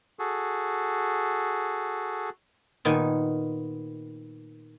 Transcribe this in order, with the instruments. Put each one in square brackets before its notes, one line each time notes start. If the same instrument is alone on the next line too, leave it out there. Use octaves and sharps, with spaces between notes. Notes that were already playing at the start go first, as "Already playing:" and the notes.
[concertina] F#4 G#4 A4
[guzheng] A#2 D#3 B3 G#5